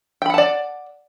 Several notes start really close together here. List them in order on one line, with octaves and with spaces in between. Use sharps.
G5 B5 F#5 A5 D5